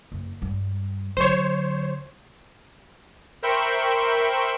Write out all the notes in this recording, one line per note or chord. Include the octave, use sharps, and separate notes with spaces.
F#1
G2 G3
D3 F#3 C5 C#5
A#4 C5 E5 G5 B5 C#6